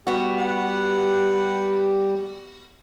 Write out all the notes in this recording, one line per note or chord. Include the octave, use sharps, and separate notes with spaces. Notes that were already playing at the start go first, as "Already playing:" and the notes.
G3 B3 F#4 G4
B4 F#5